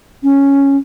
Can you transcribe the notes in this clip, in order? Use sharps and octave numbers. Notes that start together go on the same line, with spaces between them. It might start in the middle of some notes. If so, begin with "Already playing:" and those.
C#4